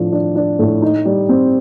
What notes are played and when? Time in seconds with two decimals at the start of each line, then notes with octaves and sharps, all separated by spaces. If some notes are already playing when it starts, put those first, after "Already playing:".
Already playing: A2 F3 D4
0.12 D4
0.35 D4
0.59 A2
0.82 D#4
1.05 G3
1.29 C4